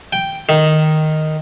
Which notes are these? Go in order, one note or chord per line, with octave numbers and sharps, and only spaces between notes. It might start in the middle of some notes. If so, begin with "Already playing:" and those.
G5
D#3